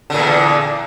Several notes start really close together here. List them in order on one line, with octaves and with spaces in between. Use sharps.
D3 A#2 E2